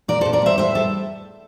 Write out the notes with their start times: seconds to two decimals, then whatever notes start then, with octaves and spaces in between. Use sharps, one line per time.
0.08 A#2 A#4 D5
0.21 A#2 A4 C5
0.33 A#4 D5
0.42 G3 C5 E5
0.58 A2 C5 E5
0.75 G3 A4